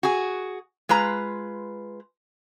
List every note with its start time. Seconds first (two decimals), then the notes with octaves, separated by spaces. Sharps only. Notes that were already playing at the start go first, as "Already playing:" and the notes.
0.03 F#4 G#4
0.89 G#3 F4 B4 A#5